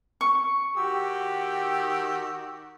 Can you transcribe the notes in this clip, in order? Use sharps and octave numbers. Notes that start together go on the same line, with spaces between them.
C#6
D#3 F#4 G4 E6